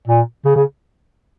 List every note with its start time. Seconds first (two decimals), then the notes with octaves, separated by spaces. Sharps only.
0.08 A#2
0.45 C#3
0.56 C#3